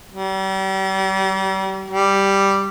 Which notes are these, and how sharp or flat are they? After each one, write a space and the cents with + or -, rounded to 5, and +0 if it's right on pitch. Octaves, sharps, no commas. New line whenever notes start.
G3 -35
G3 +0